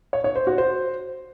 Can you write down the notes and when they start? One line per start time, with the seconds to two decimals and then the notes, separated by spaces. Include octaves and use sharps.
0.13 C#5
0.24 C#5
0.36 C5
0.47 F#4
0.58 C5